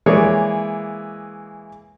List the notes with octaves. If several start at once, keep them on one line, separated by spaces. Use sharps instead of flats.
E3 G#3 A#3 G#4 C#5 D5